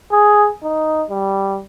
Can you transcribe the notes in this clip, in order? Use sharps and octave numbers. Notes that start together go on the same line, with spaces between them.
G#4
D#4
G3